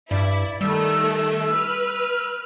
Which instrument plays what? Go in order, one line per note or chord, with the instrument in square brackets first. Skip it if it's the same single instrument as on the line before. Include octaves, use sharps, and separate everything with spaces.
[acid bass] G2 [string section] E4 [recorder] D5
[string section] D#3 A3 [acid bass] G3 [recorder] E6
[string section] B4 F6